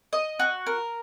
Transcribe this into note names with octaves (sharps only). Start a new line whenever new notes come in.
D#5
F#4
A#4